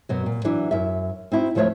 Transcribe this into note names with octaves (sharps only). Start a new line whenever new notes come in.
F#2 B2 F#3
A#2
E3 F#3 D4 E4
F#2 E5
C4 D#4 E4 F#4
D2 F3 A3 C5 C#5 E5